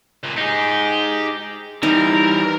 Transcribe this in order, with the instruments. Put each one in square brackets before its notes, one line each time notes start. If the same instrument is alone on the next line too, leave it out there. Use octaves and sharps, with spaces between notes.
[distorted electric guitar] C#2 A#2
[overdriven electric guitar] D#4 G#4 [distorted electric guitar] G4
[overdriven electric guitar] E3 G3 [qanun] D#4 [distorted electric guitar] A#4